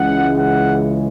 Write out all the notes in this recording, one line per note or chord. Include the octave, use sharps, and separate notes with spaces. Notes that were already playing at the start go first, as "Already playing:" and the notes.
Already playing: C#2 C#3 E3 G#3 F#5
F#5